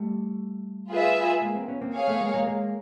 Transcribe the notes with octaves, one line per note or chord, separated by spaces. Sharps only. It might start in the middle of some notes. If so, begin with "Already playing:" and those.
Already playing: G3 A3
F4 G#4 B4 E5
G#3 A#3
A#3 C4
B3 C#4
A#3 C4
G#4 C#5 F5
A3 B3
G#3 A#3
G#3 A#3
G#3 A#3